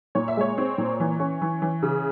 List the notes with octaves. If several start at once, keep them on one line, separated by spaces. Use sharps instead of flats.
A#2 C#5
E5
G#3 C#5
C4
A#2
E3
C#4
E3
E3
C#3